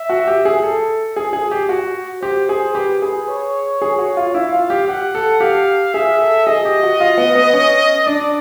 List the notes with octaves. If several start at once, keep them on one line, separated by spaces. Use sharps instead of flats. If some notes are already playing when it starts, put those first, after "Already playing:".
Already playing: E5
F#4
G4
G#4
A4
G#4
G#4
G4
F#4
G4 C5
G#4
G4 B4
G#4
C#5
G#4
F#4
F4
E4 F5
F4
G4
G4 F#5
A4
G4 F5
G#4 E5
A4
G#4 D#5
G4
F#4
F4
B3
B3
C#4
D4 D5